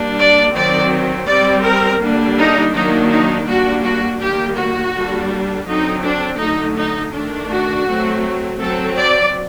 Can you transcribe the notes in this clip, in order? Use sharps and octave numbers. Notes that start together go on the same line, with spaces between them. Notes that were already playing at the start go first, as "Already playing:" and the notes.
Already playing: G3 A#3 D4
D5
D#3 F#3 C4 D5
G3 C4 D5
A#4
D3 G3 A#3 D4
D#4
D#3 F#3 A#3 D4 D#4
D#4
G3 A#3 D4 F#4
F#4
D#3 G3 A#3 G4
F#4
D3 G3 A#3 D4
D3 F#3 C4 D#4
D4
D3 F#3 A3 D#4
D#4
D#3 A3 D4
F#4
F#3 A3 C4
F#3 C4 A4
D5